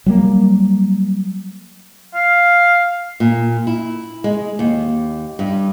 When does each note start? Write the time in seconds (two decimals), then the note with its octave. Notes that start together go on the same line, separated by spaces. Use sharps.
0.06 F#3 G3 A#3
2.15 F5
3.20 A#2
3.67 E4
4.24 G#3
4.59 D#2
5.39 G2